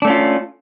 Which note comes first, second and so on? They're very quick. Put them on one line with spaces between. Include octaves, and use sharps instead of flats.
D4 A3 C#4 F4